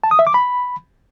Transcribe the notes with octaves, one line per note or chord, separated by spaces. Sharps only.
A5
D#6
E5
D6
B5